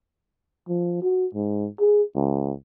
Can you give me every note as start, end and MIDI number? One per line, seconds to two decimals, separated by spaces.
0.68 0.97 53
1.02 1.26 66
1.34 1.67 44
1.80 2.02 68
2.16 2.53 37